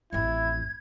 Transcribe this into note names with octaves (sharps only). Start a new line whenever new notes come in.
A1 F2 E4 G#6